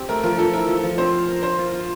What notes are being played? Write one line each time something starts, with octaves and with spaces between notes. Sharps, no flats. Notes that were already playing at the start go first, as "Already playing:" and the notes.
Already playing: C4 G4
A3 A#4
F3 A#4
F3 A4
E4 A#4
F3
F3
C4 C5
F5
A#4
A#4 C5
F4
F4